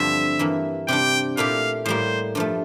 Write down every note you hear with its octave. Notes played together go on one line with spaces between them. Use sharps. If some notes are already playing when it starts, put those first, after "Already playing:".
Already playing: G2 D3 F3 A3 C4 E5
G2 E3 A#3
C3 G3 D4 G5
A#2 A3 E4 G4 F5
A2 G3 A#3 C5
G2 F3 A3